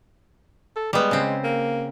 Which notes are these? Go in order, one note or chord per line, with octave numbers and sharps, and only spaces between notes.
A4
G3 G#3 B3
C#3 C4
A#3